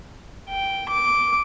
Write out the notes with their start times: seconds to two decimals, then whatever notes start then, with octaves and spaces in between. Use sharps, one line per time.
0.49 G5
0.89 D6